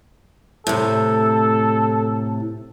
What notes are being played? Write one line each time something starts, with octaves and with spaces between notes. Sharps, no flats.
A2 C3 A4